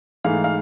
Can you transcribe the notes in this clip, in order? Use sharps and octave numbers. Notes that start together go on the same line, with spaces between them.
G#2 E3 A3 F5
F5